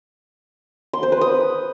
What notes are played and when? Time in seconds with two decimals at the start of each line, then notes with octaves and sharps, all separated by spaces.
0.93 C6
1.03 C5
1.12 B4
1.21 D#6